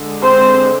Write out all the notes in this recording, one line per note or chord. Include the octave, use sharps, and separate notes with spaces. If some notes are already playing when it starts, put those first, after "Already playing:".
Already playing: D3 G#3
C4 C5